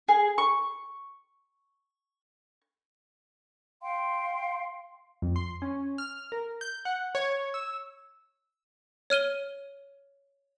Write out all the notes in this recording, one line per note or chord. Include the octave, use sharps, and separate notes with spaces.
G#4
C#6
F5 G5 C6
F2
C6
C#4
F6
A#4
G6
F#5
C#5
E6
C#5 F6 D#7 G7